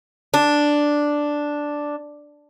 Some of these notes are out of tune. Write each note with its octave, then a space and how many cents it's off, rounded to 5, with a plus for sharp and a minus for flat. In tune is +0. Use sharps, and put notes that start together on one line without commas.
D4 +0